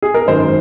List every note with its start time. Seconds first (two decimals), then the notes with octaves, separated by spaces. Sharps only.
0.02 G#4
0.14 A#4
0.28 G#1 F#2 D#3 C5